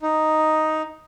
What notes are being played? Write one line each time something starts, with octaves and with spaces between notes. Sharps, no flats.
D#4